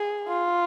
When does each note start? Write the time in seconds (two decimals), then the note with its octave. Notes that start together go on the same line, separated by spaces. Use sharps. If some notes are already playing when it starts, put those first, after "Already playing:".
Already playing: G#4
0.28 F4